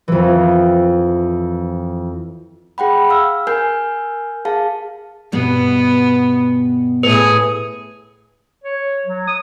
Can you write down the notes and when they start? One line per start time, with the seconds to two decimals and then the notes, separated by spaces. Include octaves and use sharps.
0.08 F2 E3
2.78 G#4 F#5 G5 B5
3.10 F5 E6 F6
3.47 A#4 G#5 F6 G6
4.45 G#4 F5 A5
5.32 G2 B2 B3
7.03 A2 G#4 B4
8.64 C#5
9.06 F#3
9.27 D#6